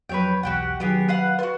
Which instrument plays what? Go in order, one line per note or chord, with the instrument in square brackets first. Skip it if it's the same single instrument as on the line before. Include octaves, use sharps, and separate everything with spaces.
[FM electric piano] F2 F#3 [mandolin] B4 C#5 G5
[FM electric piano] B1 E2 [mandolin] F#4 G4 F#5
[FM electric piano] D#3 F#3 [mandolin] B3 G4 G#4
[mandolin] B4 F5 F#5
[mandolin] F4 F#4 [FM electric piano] B4